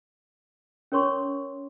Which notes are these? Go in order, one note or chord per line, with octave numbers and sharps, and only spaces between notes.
C#4 A#4 C#5 C6 C#6